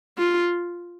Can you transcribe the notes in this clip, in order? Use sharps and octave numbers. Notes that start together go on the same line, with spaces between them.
F4